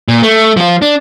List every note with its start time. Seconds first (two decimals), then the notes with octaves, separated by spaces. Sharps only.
0.08 A#2
0.23 A3
0.57 F3 F4
0.82 D4